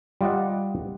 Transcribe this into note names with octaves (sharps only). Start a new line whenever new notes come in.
G3 F4 D5 D#5 F#5